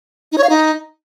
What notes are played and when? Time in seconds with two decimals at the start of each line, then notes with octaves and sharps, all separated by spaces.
0.32 D#4
0.38 C#5
0.44 F5
0.49 D#4